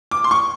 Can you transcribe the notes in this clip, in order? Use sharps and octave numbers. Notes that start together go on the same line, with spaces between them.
D6
C6
C#6